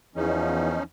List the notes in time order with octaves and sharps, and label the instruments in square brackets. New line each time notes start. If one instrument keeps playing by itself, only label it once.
[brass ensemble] E2 [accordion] F3 C#4 D#4